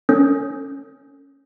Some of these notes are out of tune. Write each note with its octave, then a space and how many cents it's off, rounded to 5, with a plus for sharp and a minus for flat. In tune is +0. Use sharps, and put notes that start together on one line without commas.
C#4 +0 A4 +30